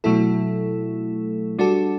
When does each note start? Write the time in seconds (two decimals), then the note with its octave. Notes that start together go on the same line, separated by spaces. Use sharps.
0.04 B2 F#3 A3 E4 A4
1.59 G3 D4 F#4 A4